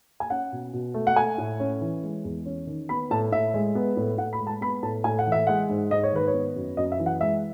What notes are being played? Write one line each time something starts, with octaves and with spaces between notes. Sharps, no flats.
G#5
C#4 F#5
B2
B2
A3
F#5
A3 G#5
A2
C#4
E3
G#3
E2
C#4
D#3
B3 B5
A2 A5
A2 E5
G#3
B3
A2
A2 F#5
B5
G#3
A5
B3 B5
A2 A5
A2 G#5
F#5
E3
E5
G#3 F#5
G#2
G#2 D#5
C#5
D#3 B4
C#5
B3
F#2
F#2 D#5
E5
E3
F#5
G#3 E5